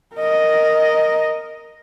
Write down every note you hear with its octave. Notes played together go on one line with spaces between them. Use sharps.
A#4 D#5